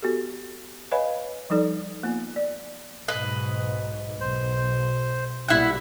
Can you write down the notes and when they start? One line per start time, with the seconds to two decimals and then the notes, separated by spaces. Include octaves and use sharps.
0.02 B3 F#4 G4 A4
0.91 B4 C#5 D#5 F5 G#5 B5
1.50 F3 G3 D#4 A4 D5
2.03 A#3 B3 F4 G#5
2.36 D5
3.08 B1 G#2 B4 D#5
4.21 B1 C5
5.48 B1 A#2 G3 E4 F#5